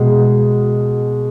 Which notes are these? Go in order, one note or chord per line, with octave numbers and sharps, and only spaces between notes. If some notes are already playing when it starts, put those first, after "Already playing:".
Already playing: B2 G#3